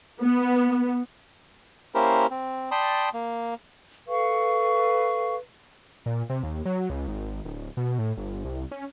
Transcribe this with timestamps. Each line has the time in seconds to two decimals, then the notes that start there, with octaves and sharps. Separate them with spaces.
0.21 B3
1.95 A#3 C#4 E4 G4 A#4 C5
2.30 C4
2.71 D5 G5 A5 B5 C6 D#6
3.14 A#3
4.07 A4 B4 F5 C#6
6.06 A#2
6.30 C3
6.43 D#2
6.66 F#3
6.90 C#2
7.08 G#1
7.45 D1
7.77 B2
7.99 A2
8.17 G1
8.45 C2
8.71 C#4